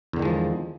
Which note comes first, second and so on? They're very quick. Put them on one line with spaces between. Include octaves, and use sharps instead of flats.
E2 D3 D#3 G#3 F3